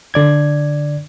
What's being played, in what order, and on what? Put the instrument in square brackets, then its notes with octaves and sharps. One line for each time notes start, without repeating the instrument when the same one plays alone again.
[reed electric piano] D3 D5 G#6